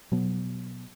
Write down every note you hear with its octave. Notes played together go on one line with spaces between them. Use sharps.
B2 F#3 B3